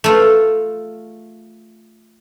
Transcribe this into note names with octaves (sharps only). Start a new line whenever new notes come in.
A3 F4